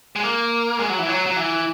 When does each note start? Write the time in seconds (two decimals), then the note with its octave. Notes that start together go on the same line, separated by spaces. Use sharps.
0.16 G#3
0.23 A#3
0.79 G#3
0.90 F#3
0.99 E3
1.09 F#3
1.27 F#3
1.37 E3